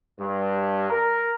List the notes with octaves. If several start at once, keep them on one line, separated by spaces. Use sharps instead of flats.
G2
A#4